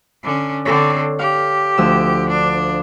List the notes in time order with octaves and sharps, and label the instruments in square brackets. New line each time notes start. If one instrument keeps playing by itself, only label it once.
[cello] D3 C#4
[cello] D3 C4 [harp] A4 C#5
[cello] G4 [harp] F5
[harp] D2 F3 E6
[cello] D4